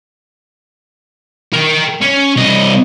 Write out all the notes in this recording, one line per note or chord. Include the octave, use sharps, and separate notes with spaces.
A#4 G5
C#4
C2 D#5